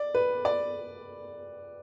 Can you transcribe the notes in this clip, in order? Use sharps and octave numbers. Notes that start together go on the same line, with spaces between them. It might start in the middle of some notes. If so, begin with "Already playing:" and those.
Already playing: D5
B4
D5